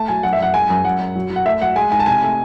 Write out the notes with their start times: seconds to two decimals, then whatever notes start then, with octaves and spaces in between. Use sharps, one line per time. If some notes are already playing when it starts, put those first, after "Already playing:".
Already playing: A3 A5
0.08 F#3 G#5
0.23 F#2 F#5
0.33 E5
0.39 F#2 F#5
0.54 G#3 G#5
0.70 F#2 G#5
0.84 F#2 F#5
1.00 F#2
1.16 F#3
1.30 F#3
1.36 F#5
1.45 A3 E5
1.61 F#3 F#5
1.76 G#3 G#5
1.91 G#2 G#5
2.00 A5
2.06 C3 G#5
2.23 A3